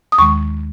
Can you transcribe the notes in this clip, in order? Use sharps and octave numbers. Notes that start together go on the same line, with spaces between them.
D#6
D#2 D#3 G#3 C#6